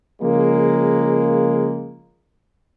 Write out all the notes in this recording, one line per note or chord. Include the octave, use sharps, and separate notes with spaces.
C#3 F3 G#3 A#3